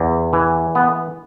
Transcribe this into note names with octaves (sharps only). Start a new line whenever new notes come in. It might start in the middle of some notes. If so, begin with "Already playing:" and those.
Already playing: E2
E3
B3